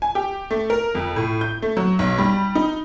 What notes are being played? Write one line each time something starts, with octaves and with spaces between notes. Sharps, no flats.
G#5
G4
A3
A#4
F2
A2
G6
A3
F#3
B1
G3
D#4